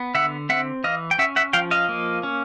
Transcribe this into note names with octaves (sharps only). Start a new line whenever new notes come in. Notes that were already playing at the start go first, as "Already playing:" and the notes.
Already playing: B3
D3 E5 F#5
C4 E5 F#5
E3 D#5 F5
G5
C#4 E5 F#5
E5 F#5
F3 F5 G5
D#5 F5
A#3
C#4